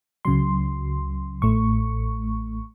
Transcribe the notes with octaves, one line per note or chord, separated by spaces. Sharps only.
C#2 C#3 F#3 C6
A1 A2 A3 C#6